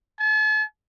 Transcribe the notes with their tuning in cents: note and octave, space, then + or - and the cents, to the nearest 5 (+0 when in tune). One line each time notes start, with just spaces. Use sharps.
A5 -45